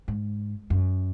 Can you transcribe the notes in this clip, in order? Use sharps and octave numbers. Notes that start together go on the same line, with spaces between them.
G#2
F#2